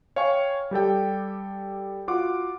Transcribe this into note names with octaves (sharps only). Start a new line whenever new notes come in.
C#5 F5 G5 G#5 C#6
G3 G4 A4 G5
F4 F#4 F#5 D6